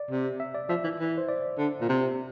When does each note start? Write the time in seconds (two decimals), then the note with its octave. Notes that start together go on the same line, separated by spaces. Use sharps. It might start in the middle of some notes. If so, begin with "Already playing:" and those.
Already playing: D5
0.11 C3
0.40 E5
0.54 D5
0.69 F3 E5
0.84 E3
0.99 E3
1.18 C5
1.29 D5
1.58 D3
1.81 A#2
1.89 C3